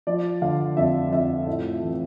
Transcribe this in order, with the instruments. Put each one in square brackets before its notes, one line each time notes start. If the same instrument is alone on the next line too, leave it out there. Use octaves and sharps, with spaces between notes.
[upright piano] F3 D5
D3 F5
F2 E5
F2 E5
A2 E5
E3